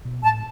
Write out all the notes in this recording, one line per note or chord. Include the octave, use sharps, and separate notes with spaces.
B2
A2 A5